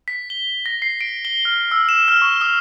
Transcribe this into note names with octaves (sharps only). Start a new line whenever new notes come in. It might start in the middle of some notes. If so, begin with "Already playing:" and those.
B6
G7
A#6
C7
D7
G7
F6
E6
E7
F6
C#6
D#6